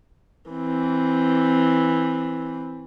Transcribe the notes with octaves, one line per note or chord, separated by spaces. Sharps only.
E3 C4